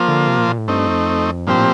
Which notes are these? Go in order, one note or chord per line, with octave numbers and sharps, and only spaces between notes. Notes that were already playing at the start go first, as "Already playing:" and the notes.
Already playing: F3 A#3 F4 C5
D3
C3
A#2
A#2
A2
G2 A3 C4 D#4
F2
G2 A#2 F3 C4 G4 C5
A2